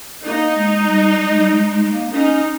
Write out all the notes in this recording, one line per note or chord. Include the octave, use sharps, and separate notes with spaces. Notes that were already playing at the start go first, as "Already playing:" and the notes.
A#3 D#4
G#3
G3
G3
G#3
G3
G#3
G#3
G#3
A#3
C#4 D#4